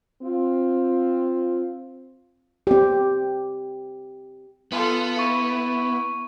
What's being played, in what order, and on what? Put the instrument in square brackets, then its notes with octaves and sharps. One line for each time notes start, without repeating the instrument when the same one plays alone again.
[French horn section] C4 F4
[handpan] C4 G4
[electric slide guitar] B3 [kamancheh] F4 A4
[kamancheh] E4 [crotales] C#6